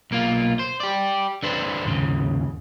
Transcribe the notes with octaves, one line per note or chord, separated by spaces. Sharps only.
B1 A#3 F4
C5
G4 D5
D3 D4 B4 C5
D#2 G#2 C#3